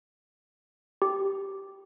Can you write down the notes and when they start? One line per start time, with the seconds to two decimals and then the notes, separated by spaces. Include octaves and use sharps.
1.02 G4